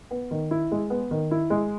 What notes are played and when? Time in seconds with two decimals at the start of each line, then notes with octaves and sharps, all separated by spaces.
0.11 B3
0.31 D#3
0.51 E4
0.71 G#3
0.90 B3
1.11 D#3
1.31 E4
1.50 G#3